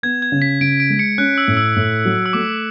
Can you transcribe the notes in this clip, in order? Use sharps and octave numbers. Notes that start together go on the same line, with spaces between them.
B3 G#6
G#6
C#3
B6
C#3 D7
D7
G#3
C#7
C#4 F#6
E6
A2
E6
A2
F#3
E6
A3 D6